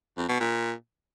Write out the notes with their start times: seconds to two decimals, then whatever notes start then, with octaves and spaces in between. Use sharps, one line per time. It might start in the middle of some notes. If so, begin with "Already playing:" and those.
0.18 F2
0.29 B2
0.40 A#2